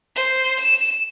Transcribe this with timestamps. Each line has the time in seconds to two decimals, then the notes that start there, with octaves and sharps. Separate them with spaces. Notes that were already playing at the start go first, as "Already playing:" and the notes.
0.15 C5
0.60 E7